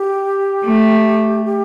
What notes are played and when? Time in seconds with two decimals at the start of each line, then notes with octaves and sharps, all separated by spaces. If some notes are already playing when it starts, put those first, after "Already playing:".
Already playing: G4
0.64 A3
1.45 G4